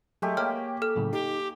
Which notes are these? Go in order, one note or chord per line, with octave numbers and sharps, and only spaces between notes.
F#3 G#3 A3 G4
A#3 C#5 G5 F6
A4 F6
A2 C#3 F#3
D#4 G4